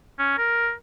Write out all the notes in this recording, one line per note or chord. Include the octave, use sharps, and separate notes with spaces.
C#4
A#4